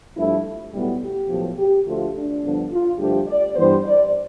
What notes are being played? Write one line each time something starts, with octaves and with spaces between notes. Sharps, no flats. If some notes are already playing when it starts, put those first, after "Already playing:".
G2 F3 A3 E4
B1 A2 G3 B3
G4
B1 A2 F3
G4
D2 D3 F3 A3 F4
D4
G2 D3 F3 B3
F4
G2 D3 F3 A3 G4
D5
G2 E3 G3 B3 C5
D5